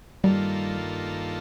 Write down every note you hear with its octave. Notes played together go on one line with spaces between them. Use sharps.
G2 D#3 G3 A#3 F4 A4